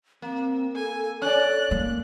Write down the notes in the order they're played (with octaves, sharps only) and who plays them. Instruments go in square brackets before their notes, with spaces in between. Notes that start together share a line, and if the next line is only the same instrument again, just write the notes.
[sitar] A#3 [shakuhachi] C4
[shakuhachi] A4 [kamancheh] G#5
[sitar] C#4 D5 [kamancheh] F#6
[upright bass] A#3